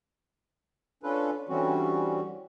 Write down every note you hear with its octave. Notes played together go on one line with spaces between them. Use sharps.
C#4 D4 F4 A4 B4
D3 E3 G3 C4 C#4 F#4